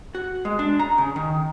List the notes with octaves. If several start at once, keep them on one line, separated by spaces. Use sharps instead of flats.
F#4
G#3
D4
A#5
C#3
D#3